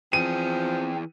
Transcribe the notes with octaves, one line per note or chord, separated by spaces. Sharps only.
E3 F3 C4 G#4 D#7